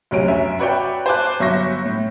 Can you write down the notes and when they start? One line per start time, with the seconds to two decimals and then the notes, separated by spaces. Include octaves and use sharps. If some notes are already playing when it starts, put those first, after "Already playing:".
0.11 F1 D2 F#3 C#4 D7
0.28 F#2 C#4 E5
0.59 F#4 B4 C#5 D5 E5 G5
1.06 C5 G#5 A5 D6 F#6
1.40 G1 F#3 E5 C6 C#6 A#6
1.85 A2